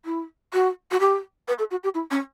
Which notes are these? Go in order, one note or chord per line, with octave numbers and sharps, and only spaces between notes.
E4
F#4
F#4
G4
B4
A4
F#4
G4
E4
C#4